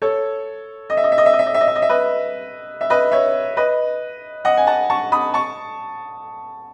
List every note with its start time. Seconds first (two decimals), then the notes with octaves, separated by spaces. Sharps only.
0.02 A4 C#5
0.90 D#5
0.97 E5
1.04 D#5
1.12 E5
1.18 D#5
1.26 E5
1.33 D#5
1.39 E5
1.46 D#5
1.54 E5
1.61 D#5
1.68 E5
1.75 D#5
1.82 E5
1.89 B4 D#5
2.81 E5
2.90 B4 D#5
3.12 C#5 E5
3.57 B4 D#5
4.45 D#5 F#5
4.57 G#5
4.67 F#5 A5
4.90 A5 C#6
5.12 B5 D#6
5.34 A5 C#6